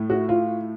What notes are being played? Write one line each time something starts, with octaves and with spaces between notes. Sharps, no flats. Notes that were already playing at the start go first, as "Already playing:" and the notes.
Already playing: A2 A3
F#4
F4